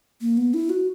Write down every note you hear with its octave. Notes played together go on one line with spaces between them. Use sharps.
A#3
B3
E4
F#4